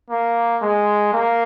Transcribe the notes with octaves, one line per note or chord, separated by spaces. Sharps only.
A#3
G#3
A#3